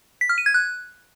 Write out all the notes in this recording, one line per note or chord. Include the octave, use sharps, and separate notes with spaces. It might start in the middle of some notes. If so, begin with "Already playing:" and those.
B6
F6
D#7
G#6
F#6